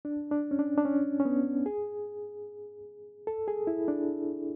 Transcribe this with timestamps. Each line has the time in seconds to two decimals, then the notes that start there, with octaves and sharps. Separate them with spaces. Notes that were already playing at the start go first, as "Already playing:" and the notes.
0.05 D4
0.31 D4
0.51 C#4
0.59 D4
0.78 D4
0.85 C#4
1.20 C#4
1.25 B3
1.66 G#4
3.27 A4
3.48 G#4
3.67 E4
3.88 D4